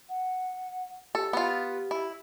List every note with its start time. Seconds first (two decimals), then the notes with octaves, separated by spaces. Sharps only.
0.10 F#5
1.15 G4 A4
1.33 B3 F4
1.91 E4